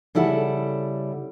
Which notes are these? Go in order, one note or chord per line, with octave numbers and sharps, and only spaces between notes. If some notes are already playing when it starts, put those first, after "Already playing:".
C#3 G3 E4 A4 F#5